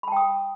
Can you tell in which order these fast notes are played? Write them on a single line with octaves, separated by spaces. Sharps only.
B5 A5 G5 D#6